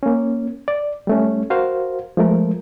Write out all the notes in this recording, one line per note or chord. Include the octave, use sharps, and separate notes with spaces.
A#3 C#4
D5
G3 A3 C#4
F#4 A#4 C5 F5
F3 G#3 A3 A#4